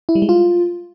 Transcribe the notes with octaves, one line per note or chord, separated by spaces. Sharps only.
E4
G3
G#3
F4